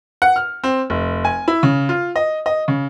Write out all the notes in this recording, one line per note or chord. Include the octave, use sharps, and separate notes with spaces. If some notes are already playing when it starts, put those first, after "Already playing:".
F#5
F6
C4
F1
G#5
E4
C#3
F4
D#5
D#5
C#3